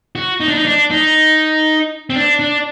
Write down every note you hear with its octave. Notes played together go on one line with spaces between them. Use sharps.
F#4
D#4
D4
D#4
D4
D#4
C4
D4
D4